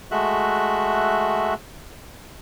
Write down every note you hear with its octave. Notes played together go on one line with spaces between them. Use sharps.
G#3 A3 F#4 E5 F#6